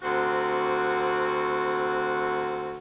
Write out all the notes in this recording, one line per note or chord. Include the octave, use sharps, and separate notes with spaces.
D2 C3 C4 F#4